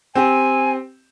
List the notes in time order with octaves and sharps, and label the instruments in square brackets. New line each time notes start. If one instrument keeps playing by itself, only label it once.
[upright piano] C4 G4 [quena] G#5